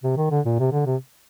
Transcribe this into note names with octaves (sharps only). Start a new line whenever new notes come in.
C3
D#3
D3
A#2
C3
D3
C3